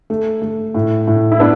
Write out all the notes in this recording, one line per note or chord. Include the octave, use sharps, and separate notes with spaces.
A3
A3
A2
A2
E4
B3 D4